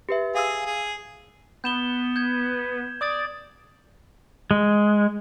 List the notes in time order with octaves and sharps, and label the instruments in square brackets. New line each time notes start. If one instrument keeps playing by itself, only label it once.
[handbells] G4 B4 E5
[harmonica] G#4 [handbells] F5 D#6 E6
[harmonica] G#4
[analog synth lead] B3 [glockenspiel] G6 E7 G7
[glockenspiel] G6 G#6
[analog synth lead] D5 [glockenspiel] D6 D#6 A6
[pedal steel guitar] G#3